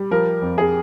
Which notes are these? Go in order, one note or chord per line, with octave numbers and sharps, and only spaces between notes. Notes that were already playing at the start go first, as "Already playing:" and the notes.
Already playing: G3
F3 A#4
F2
G#4